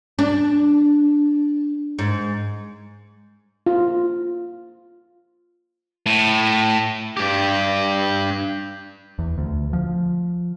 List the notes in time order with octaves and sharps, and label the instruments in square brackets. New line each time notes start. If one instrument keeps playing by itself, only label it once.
[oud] D4
G#2
[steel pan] F4
[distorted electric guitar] A2
[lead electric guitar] G2 G4
[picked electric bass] E2
D2
F3